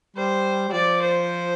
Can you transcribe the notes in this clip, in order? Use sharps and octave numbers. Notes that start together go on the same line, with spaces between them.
G3 C5
G3
F3 D5
C5